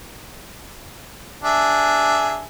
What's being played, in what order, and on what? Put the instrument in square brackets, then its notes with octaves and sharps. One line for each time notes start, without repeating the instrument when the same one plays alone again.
[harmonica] D4 G#4 E5